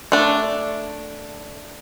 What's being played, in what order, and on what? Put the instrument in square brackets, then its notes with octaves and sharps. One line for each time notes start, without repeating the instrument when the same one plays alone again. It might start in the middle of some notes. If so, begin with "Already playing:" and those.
[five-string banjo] A3 D4